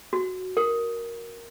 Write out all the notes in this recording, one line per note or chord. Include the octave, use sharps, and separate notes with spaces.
F#4
A#4